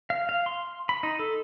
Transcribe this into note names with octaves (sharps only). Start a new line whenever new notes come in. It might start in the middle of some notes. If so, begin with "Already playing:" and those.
F5
F5
C6
B5
D#4
A4